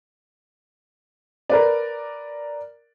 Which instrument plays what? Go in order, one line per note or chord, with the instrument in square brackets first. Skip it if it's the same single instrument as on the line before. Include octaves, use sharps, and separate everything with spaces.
[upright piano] A#4 B4 D5